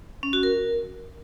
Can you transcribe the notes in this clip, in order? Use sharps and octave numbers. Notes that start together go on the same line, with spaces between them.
C#4
F#4
A#4